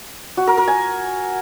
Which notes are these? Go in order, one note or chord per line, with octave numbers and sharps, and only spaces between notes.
F#4
A#4
A#4
G#5